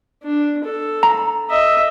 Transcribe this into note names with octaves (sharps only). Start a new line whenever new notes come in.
D4
A4
A#5
D#5 E5